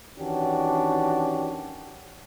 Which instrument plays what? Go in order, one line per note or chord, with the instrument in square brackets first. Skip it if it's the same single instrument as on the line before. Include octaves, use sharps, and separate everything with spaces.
[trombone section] D#3 E3 C#4 D4 F#4 G4